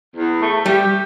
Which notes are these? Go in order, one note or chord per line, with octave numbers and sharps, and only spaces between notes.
E2
A3
G3 G4